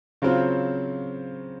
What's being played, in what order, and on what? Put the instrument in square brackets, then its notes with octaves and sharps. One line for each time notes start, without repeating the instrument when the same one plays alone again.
[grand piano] C#3 F#3 C4 F4 C5